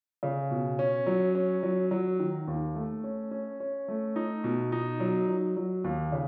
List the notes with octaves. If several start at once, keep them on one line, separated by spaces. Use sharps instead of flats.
C#3
B2
C#4
F#3
C#4
F#3
F#3
D#3
D#2
A3
C#4
C#4
C#4
A3
D#4
B2
D#4
F#3
F#3
F#3
D#2
C#3